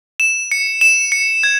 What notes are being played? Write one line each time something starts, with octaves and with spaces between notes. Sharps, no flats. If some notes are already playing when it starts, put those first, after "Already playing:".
E7
C#7
E7
C#7
G#6